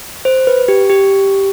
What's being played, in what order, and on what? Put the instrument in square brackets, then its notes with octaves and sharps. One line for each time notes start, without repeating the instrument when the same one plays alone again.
[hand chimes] C5
B4
G4
G4